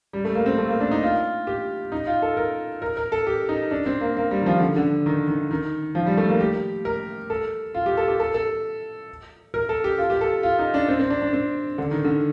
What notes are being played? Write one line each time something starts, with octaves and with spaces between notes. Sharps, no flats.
G3
A3
A#3
C4
A3
A#3
D4
D#4
F4
G4
D#4
F4
A4
A#4
A#4
A#4
A4
G4
D#4
D4
C4
A#3
A#3
G3
D#3
F3
D3
D3
D#3
D#3
D#3
F3
G3
A3
A#3
G4
A#4
A4
F4
G4
A4
G4
A4
A4
A#4
A4
G4
F4
G4
A4
F4
D#4
D4
C4
C4
D4
D4
C4
D3
D#3
D3